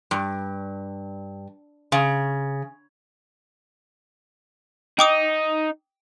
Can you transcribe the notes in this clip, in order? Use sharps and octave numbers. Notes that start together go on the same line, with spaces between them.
G2
C#3
D#4 G5 D6 D#6